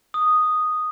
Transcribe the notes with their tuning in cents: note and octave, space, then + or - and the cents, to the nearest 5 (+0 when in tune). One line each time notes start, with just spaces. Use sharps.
D#6 -5